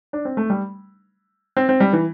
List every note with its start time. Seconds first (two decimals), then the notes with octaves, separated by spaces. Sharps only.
0.13 D4
0.25 C4
0.37 A3
0.50 G3
1.57 C4
1.69 C4
1.80 G3
1.93 E3